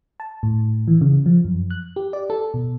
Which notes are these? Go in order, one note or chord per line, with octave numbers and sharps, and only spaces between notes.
A5
A2
E3
C#3
F3
F#2
F#6
G4
D5
A4
B2